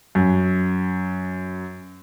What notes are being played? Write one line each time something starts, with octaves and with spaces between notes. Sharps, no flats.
F#2